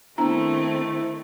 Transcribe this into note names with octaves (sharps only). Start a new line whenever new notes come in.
D#3 A3 B3 C4 D4 E4 A#5